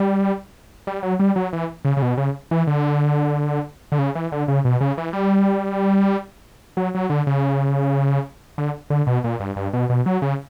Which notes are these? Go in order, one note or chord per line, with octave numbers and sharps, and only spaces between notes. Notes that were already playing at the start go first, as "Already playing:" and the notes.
Already playing: G3
G3
F#3
G3
F#3
E3
C#3
C#3
B2
C#3
E3
D3
D3
C#3
E3
D3
C#3
B2
C#3
E3
G3
F#3
F#3
D3
C#3
D3
D3
B2
A#2
G2
G2
B2
B2
F#3
C#3